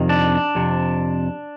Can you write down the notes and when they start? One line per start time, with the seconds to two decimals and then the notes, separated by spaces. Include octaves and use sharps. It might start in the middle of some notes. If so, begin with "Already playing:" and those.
Already playing: F2 C3 D#3
0.09 D4
0.55 F2 C3